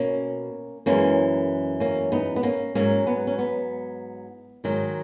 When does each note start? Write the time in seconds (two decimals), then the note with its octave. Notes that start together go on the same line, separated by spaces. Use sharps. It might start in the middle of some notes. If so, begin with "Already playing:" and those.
Already playing: B2 A#3 C#4
0.86 F#2 E3 G#3 A#3 C#4
1.80 A#3 C#4
2.12 B3 D#4
2.36 B3
2.43 A#3 C#4
2.75 G#2 F#3 A#3 C#4
3.07 B3
3.27 C#4
3.39 B3
4.64 G#2 D#3 F#3